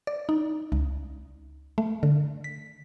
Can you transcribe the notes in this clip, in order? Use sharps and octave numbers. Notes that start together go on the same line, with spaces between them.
D5
D#4
C#2
A3
D3
B6